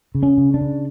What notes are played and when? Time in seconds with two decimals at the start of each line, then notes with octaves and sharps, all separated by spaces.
0.15 C#3
0.23 C#4
0.38 C#3
0.54 D4
0.61 C#3